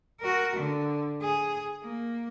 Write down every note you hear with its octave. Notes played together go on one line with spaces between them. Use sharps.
F#4 A#4
D3
G#4
A#3